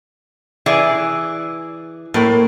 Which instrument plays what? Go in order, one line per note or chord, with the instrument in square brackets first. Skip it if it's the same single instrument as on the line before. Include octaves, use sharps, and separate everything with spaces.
[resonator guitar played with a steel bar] E3 G#4 D5
[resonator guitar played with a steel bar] A2 [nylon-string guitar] A#3 A#4 C5